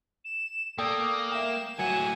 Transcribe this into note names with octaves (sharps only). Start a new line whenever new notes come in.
E7
A#3 A4 D5 G5 D#6
E5 G5 E7
A2 F#3 F#5 G#5